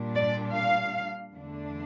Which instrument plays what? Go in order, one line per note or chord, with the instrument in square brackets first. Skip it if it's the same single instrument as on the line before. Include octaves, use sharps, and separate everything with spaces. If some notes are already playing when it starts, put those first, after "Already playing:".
Already playing: [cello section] A#2 G3 D4
D5
F5
E2 D3 A3 D4